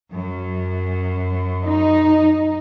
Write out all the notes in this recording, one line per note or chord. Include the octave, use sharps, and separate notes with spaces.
F#2
D#4